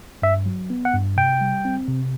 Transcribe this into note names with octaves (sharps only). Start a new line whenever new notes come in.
G2 E5
F#3
B3
F#5
G2
C3 G5
G3
C4
C3